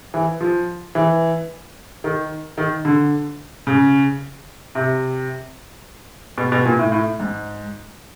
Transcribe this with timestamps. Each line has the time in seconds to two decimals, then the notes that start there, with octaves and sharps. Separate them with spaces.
0.14 E3
0.40 F3
0.95 E3
2.04 D#3
2.58 D#3
2.85 D3
3.67 C#3
4.75 C3
6.38 B2
6.52 B2
6.65 A#2
6.79 A2
6.92 A2
7.20 G#2